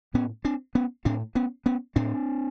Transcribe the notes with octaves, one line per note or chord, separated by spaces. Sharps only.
A2 B3 C#4
C4 D4
B3 C#4
A2 C4 D4
B3 C#4
B3 C#4
A2 C4 D4